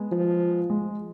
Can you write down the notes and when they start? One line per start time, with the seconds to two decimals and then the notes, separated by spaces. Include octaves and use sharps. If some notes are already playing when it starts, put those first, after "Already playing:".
Already playing: G#3 B3
0.11 F3
0.70 G#3